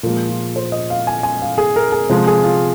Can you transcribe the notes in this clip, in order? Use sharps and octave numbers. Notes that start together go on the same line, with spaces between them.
A#2 F3 G#3 A#4
F4
C5
D#5
F5
G#5
G#5
F5
G#4
A#4
G#4
C3 F3 G#3
G#4
F4